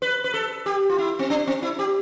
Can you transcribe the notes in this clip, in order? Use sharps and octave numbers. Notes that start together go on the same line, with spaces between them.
B4
B4
A4
G4
F4
E4
C4
D4
C4
E4
G4